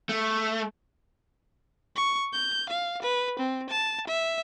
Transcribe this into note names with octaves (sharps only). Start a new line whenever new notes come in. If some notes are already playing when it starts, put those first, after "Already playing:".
A3
C#6
G6
F5
B4
C4
A5
E5